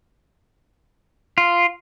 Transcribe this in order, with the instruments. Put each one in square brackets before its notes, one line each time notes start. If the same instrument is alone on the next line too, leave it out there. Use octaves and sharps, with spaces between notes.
[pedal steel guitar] F4